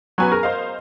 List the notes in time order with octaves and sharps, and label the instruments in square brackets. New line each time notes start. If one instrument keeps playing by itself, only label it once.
[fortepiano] F#3 B3 [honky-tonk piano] B4 G#5 C#6
[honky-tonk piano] G#4 A#5 [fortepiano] A#4
[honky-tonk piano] C5 D#5 F5